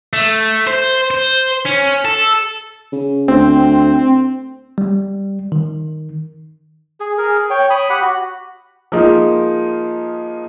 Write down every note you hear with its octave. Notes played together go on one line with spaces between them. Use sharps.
A3
C5
C5
C#4
A4
C#3
D2 C4
G3
D#3
G#4
G#4 A#4
C#5 G5
C#5 B5 D#6
G4 F#5 B5
F#4
F3 G#3 A#3 D#4 F4